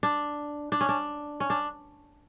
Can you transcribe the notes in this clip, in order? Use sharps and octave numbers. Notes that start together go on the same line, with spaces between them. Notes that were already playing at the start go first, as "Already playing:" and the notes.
D4
D4
C#4
D4
C#4
D4